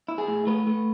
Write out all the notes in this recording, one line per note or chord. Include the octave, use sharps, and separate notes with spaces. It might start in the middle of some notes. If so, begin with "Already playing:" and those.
E4
G#4
A2
A3 B4
A3